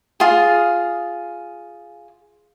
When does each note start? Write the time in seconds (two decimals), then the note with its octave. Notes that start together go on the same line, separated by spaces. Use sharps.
0.20 F4 G#4